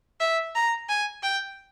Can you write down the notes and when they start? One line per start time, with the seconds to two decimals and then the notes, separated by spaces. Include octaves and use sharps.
0.20 E5
0.55 A#5
0.89 G#5
1.23 G5